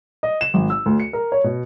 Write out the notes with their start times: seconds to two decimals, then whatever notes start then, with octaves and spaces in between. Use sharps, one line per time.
0.23 D#5
0.41 E7
0.54 G#1
0.70 E6
0.86 D2
1.00 C#7
1.13 A#4
1.32 C#5
1.44 B2